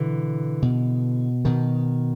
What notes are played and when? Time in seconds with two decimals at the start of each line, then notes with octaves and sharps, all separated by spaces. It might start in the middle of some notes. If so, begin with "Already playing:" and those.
Already playing: B2 D3 E3
0.62 B2
1.45 B2 D#3